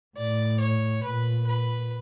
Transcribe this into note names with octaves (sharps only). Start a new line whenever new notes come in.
A2 D5
C#5
A#2 B4
B4